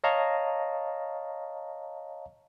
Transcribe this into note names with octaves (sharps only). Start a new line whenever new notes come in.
C#5 D#5 F5 A5 A#5 C#6